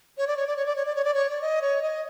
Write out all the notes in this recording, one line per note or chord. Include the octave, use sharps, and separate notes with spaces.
C#5
D5
C#5
D5
C#5
D5
C#5
D5
C#5
D5
C#5
D5
D#5
C#5
D#5